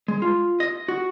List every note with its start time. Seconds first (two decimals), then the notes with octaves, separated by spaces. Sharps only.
0.08 G#3
0.22 F4
0.60 D#5
0.88 F#4